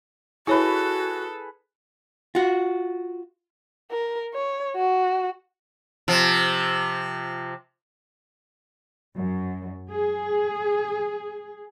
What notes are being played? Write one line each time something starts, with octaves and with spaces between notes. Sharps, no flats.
E4 F#4 G#4 A4 B4 C#5 E5
F4 F#4
A#4
C#5
F#4
C3 F3
F#2
G#4